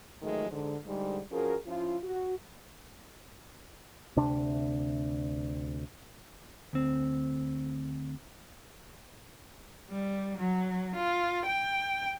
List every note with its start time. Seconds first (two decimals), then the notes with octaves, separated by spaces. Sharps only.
0.22 G#2 D#3 F3 F#3 G#3 A3
0.50 G#2 D3
0.86 G#2 D3 G3
1.32 F3 C#4 F#4 G#4 A#4
1.67 F3 C#4 E4 F4
2.04 F#4
4.17 D2 C3 D4
6.73 D2 C4
9.90 G3
10.38 F#3
10.96 F4
11.47 G5